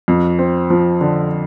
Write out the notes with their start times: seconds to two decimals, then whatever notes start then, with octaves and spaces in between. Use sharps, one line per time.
0.08 F2
0.39 C4
0.70 F3
1.01 D3